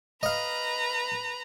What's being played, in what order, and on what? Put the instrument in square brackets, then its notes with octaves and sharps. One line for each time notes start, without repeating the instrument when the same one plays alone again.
[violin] B4 A#5 [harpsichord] D#5 F5